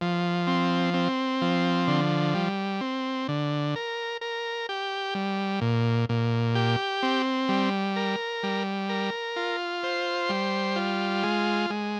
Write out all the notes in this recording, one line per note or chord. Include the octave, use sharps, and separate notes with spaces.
F3
C4
C4
F3
D3
G3
C4
D3
A#4
A#4
G4
G3
A#2
A#2
G4
C4
G3
A#4
G3
A#4
F4
C5
G3
F4
G#3
G#3